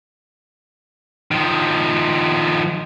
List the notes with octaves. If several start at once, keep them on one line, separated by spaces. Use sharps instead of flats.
D#3 F3